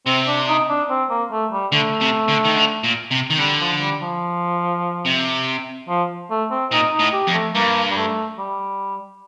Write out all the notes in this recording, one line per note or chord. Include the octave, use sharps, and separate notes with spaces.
C3 C4
D4
D#4
D4
C4
A#3
A3
G3
D3 A3
C3
D3
D#3
D3
A#2
C3
D#3
D3 G3
F3
G3
F3
C3
F3
A3
C4
A#2 D#4
D#4
A2
G4
F2
A3
G2 A#3
G3
A3
G3